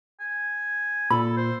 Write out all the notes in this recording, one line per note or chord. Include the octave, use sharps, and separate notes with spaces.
G#5
A#2 A4 B5
C5